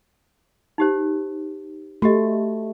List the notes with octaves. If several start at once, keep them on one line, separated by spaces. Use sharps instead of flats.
D#4 G4 C5
A3 F#4 G4 D#5